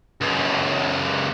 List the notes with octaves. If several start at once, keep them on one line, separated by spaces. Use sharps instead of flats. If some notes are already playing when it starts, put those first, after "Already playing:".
C#2 F#2